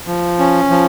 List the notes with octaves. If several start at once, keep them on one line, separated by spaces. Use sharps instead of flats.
F3
C#4
F3